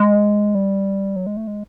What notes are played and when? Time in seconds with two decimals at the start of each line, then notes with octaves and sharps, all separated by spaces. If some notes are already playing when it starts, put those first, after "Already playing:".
Already playing: G#3
0.55 G3
1.16 F#3
1.26 G#3
1.37 A3
1.47 G#3